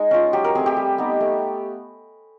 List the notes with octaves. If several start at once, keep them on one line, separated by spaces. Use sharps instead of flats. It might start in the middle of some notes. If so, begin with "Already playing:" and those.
Already playing: G#3 D#4
C#4 F4
F#3 G4
A#4
A3 C4 G#4
G4
G3
B3 D#4
A3